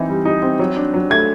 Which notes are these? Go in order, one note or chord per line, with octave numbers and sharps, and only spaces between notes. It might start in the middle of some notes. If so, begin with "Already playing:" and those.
Already playing: E3 C4 D#4
G3
D#4
C4
F#3
D4
F#3
A3 G#6